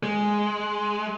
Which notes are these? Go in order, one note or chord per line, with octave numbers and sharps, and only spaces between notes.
G#3